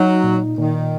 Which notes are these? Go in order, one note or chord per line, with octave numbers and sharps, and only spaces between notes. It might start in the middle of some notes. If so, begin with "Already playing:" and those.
Already playing: F#3 D#4
A#2
A#2 D#3